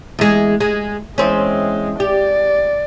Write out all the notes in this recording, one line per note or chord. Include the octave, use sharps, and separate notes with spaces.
E2 G#3
G#3
E2 G#3 C4 C#4
G4 D5